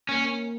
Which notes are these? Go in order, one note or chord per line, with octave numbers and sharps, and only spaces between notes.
A#3 C#4